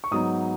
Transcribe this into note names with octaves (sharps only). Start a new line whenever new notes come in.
C#6
G#2 F#3 B3 D#4 D#6